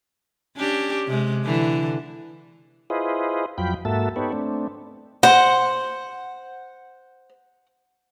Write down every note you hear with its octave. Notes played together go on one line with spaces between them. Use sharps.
C#4 D4 G4
C3 G#3
D3 E3
E4 F4 G#4 B4 C5 D#5
F2 F#3 F4 G5 B5
G#2 A#3 F#4 A4 E5 A5
B3 D#4 G4 A4 B4 C#5
A3 C4 D4
C5 F#5